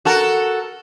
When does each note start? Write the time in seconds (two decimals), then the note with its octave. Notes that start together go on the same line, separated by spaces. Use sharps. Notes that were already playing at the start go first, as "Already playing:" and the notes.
0.05 F#4 A4 A#4